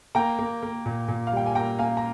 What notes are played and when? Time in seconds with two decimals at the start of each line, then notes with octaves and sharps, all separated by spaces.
0.15 A#3 G5 A#5
0.39 A#3
0.63 A#3
0.86 A#2
1.08 A#2
1.27 F5
1.33 G3 G5
1.46 G#5
1.55 A#3 G5 A#5
1.79 A#3 F5 G#5
1.97 A#5